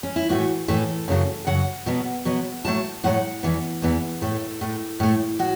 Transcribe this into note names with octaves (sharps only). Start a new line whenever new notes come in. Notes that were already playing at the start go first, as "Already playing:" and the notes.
C#4
E4
A2 E3 A3 F#4
A2 E3 A3 A4
F#2 C#3 F#3
F#2 C#3 F#3 F#5
B2 F#3 B3
B2 F#3 B3
A2 F#3 A3 A5
A2 F#3 A3 F#5
E2 E3 B3
E2 E3 B3
A2 A3 A4
A2 A3
A2 A3
A2 F#4